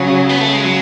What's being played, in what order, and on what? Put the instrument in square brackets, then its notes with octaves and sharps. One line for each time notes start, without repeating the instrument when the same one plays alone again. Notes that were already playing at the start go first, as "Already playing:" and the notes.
Already playing: [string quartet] C#3 [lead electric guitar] F#3
[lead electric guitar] B3
A3
G#3
F#3